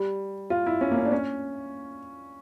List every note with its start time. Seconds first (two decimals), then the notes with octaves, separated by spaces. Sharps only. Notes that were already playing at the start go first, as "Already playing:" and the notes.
Already playing: G3
0.50 F4
0.66 E4
0.81 C#4
0.91 A#3
0.97 C#4
1.05 D4
1.12 C#4